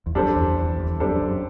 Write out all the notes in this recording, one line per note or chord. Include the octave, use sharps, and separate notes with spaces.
E2
F#2 G3 D4 A4 C5
E2
E2
E2
F#2 G3 D4 A4 C5
F#2